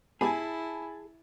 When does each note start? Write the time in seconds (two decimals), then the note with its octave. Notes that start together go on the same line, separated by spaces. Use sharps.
0.21 G#3 B3 E4 G4 G#4 G#5 A5 B5